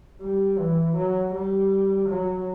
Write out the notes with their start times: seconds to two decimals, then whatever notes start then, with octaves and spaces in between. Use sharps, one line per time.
0.21 G3
0.58 E3
0.97 F#3
1.35 G3
2.09 F#3